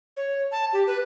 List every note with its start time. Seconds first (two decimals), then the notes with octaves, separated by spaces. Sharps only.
0.17 C#5
0.52 A5
0.73 G4
0.87 B4